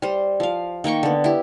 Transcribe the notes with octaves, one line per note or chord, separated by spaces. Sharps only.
G3 C5
F3 F5
D#3 A#3 G5 C#6
D3 B3
E4 G4